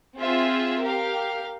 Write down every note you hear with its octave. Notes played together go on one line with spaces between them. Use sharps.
C4 F4 G#4 E5
G4 A#4 F5